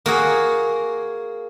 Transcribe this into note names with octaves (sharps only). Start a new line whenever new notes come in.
A#3 F#4 G#4